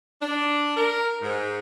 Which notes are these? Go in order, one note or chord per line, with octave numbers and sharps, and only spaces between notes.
D4
A#4
G#2